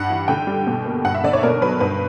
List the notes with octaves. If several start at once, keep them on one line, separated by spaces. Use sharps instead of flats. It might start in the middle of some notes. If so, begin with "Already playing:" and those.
Already playing: G2 G3 F#5
E3
D3 G5
G3
B2
A#3
G2 F#5
E5
D3 D5
C#5
B2 A#4
F#3 B4
G2 B4